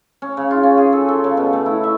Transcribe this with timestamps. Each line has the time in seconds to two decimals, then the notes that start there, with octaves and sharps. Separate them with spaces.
0.22 C#4
0.37 C#3
0.51 F4
0.63 C#4
0.78 G#4
0.93 A4
1.09 A4
1.24 C#3
1.37 B2
1.53 A3
1.66 E4
1.84 E5